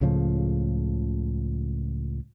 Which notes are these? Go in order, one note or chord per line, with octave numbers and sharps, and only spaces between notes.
C#2 A2 C#3 F3